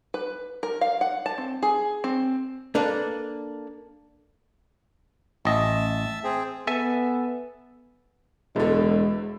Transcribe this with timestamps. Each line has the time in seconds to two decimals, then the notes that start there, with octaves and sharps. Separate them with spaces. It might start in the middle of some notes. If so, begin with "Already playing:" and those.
0.14 B4
0.63 A#4
0.81 F5
1.01 F#5
1.26 A5
1.38 C4
1.62 G#4
2.04 C4
2.75 A#3 D4 A4 B4
5.45 A1 D#5 E5 A5
6.24 C4 G#4
6.67 B3 A4 E5 G#5
8.56 E1 E2 D3 G#3